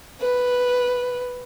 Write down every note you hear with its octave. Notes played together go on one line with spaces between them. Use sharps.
B4